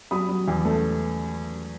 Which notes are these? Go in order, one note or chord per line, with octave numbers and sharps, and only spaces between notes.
F#3 B5 D#6
F#3
E2
A3